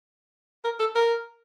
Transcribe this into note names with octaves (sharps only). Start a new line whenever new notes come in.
A#4
A4
A#4